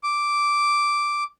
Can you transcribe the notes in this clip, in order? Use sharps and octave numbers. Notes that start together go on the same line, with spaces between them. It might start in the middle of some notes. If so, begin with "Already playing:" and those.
D6